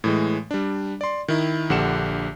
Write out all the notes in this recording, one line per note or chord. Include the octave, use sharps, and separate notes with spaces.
A2 E3 G#3
G3 D4
D5 C6
D#3 E4
A#1 D3 G4 F#5 C#7 E7